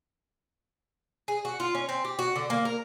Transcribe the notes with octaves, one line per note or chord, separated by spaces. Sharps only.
G#4
F#4
F4
C#4
C4
G4
F#4
D3
A#3
A#4